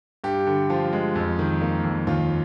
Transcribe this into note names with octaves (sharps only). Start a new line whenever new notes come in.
G2 G4
D3
F3 F4
G#3
F2
D#3
A#3
F2
D#2 F4